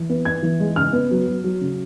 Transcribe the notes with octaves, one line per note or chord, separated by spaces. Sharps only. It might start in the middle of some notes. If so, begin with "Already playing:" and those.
Already playing: E3
B3
B3 G#6
E3
G#3
C#3 F6
B3
F#3
F#3
F#3
C#3